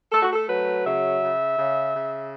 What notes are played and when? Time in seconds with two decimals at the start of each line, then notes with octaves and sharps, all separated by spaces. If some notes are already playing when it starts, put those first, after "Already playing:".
0.11 A3 A4
0.21 F#4
0.32 A4
0.47 F#3 B4
0.85 C#3 E5
1.21 C#3
1.57 C#3
1.93 C#3